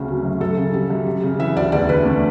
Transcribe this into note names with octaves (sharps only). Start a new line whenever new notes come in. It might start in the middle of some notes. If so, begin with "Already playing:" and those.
Already playing: D2 C#3 A3
F#3
F#2
F#2 A4
C#3
G3
F#2
G3
C#3
E3 E5
D2 D5
E2 D5
D3 B4
A3